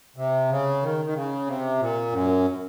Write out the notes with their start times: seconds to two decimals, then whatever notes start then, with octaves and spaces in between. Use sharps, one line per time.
0.16 C3
0.50 C#3
0.83 D#3
1.05 D#3
1.15 C#3
1.47 C3
1.80 A#2
2.12 F#2